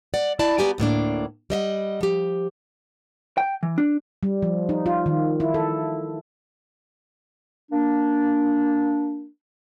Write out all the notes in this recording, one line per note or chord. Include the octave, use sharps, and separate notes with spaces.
D5 F#5
E4 D5 A5
B3 F#4 G4 D5 G#5 A#5
D2 A2 A#3 D4
G3 D#5 E5 F#5
F3 G4
G5
E3
D4
G3
F3
D#4
F4
D#3
E4
A4
A#3 D4